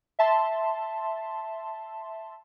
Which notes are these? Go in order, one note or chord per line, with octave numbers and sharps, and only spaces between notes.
E5 A5 C6